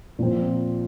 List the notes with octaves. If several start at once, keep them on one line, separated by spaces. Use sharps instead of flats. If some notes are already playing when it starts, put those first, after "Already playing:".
A#2 F3 C4